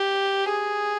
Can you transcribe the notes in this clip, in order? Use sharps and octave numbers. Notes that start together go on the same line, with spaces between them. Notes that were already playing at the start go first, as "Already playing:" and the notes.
Already playing: G4
G#4